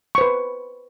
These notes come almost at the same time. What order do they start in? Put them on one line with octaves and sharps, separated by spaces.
C#6 C5 B4